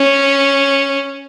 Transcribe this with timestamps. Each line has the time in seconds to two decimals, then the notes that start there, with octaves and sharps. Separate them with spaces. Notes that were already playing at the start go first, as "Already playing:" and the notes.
Already playing: C#4